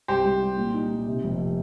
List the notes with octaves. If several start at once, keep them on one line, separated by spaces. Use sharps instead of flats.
C2 G4 C5
G3
G3
A#2
D#4
A#2
C3
F1